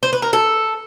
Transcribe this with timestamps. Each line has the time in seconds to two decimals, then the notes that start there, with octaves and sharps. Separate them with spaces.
0.03 C5
0.13 B4
0.22 A#4
0.33 A4